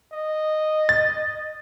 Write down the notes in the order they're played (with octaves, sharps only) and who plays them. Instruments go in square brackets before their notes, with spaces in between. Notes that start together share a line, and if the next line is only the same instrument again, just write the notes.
[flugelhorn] D#5
[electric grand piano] A6